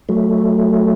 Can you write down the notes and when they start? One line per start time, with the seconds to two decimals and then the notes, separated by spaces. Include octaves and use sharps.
0.09 F#3 A3